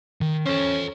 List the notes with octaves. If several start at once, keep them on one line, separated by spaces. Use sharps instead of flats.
D#3
C#4 A4 C5